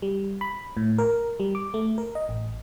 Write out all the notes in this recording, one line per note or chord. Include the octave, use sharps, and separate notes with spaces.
G3
B5
A2
A#4
G3
D6
A3
A#4
D#5
A1